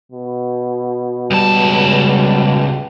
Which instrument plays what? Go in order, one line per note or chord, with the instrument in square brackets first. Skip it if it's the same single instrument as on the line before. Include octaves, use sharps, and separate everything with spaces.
[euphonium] B2
[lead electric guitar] C#2 A5 [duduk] G3